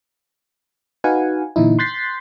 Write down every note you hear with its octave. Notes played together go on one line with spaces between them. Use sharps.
D#4 F#4 B4 F5 F#5 G#5
A#2 D3 E3 D#4 E4
C6 F#6 G6 A6 B6 C7